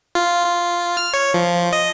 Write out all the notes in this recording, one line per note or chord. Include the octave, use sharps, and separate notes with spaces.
F4
F4
F6
C#5
F3
D#5